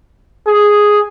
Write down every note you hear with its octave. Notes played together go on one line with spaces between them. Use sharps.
G#4